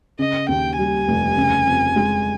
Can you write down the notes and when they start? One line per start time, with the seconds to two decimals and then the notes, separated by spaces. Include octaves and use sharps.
0.19 C#3 D#5
0.49 D#2 G5
0.78 G3 G#5
1.08 F1
1.37 C#3
1.66 F2
1.96 G#3